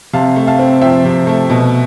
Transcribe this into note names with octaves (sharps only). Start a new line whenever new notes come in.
C3 F5 A5
A3
F5 A5
C4
F3 E5 G5
C3
A3
B2